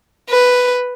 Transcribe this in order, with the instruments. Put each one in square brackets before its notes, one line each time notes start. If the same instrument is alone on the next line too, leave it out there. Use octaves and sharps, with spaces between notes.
[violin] B4